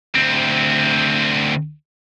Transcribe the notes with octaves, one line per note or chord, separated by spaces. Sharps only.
D2 C4